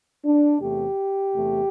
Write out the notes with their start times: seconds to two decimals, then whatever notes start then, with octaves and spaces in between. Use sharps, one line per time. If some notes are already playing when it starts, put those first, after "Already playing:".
0.24 D4
0.60 E2 C3 A3 G4
1.35 E2 C3 A3